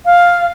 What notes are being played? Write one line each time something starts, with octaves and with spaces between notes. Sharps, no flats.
F5